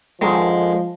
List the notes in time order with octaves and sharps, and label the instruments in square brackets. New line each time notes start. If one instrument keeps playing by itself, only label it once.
[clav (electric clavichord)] F#2 D3 D#3 [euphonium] F3 [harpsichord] G#3